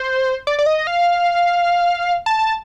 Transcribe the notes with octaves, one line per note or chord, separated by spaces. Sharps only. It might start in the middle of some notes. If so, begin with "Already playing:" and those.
Already playing: C5
D5
D5
D#5
F5
A5